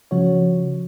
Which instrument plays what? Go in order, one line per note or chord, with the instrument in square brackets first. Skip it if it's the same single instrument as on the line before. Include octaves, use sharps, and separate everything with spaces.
[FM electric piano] C#3 F3 F#4 C#5